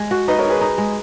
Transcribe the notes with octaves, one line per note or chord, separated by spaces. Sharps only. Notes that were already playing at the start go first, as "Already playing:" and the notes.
Already playing: G#3
F#4
D#4 B4 D#5
A#4 C#5
D#4
G#4 B4
D#4
G#3